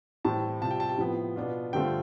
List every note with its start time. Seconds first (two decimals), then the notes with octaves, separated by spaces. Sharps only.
0.25 A2 E3 G3 C4 E4 A5
0.61 C3 G3 C4 F4 A5
0.71 G5
0.80 A5
0.89 G5
0.98 A2 F3 B3 E4
1.36 B2 B3 D4 F4
1.73 G2 D3 A3 C4 F4 G5